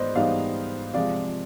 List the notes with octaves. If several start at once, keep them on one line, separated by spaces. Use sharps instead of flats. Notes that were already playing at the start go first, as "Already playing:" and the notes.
Already playing: G#2 B3 D#4 C5 D5 D#5
G#2 G3 B3 D#4 D5 F5
C3 F3 G#3 D5 F5